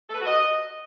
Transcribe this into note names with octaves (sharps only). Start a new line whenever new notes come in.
A4
B4
F#4
D#5